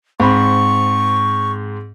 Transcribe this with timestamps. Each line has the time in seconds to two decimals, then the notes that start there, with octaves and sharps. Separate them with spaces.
0.20 G#2 C4 B5 C#6